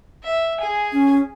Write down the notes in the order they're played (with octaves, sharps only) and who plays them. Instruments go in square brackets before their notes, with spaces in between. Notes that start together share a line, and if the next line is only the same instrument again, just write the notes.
[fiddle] E5
G#4 G#5
[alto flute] C#4